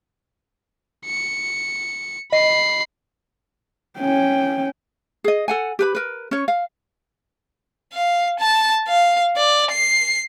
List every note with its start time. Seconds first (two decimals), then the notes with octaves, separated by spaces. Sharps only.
1.06 C#7
2.32 D#5 B5 C7
3.99 C#4 G5
5.24 G#4 D#5
5.48 A4 F#5 G#5
5.79 G4 B4 B5
5.95 A#4 B4
6.31 C#4 C#5
6.48 F5
7.94 F5
8.40 A5
8.89 F5
9.37 D5
9.71 C7